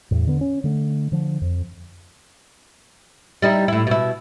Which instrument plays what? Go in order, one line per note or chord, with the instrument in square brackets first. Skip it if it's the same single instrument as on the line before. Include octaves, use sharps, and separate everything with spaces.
[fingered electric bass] E2 A2
D3 B3
C#4
D3 A3
D3 F3
F2
[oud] G3 D#4 E4
A2 E4
B2 E4